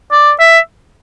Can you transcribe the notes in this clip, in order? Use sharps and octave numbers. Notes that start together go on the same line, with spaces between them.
D5
E5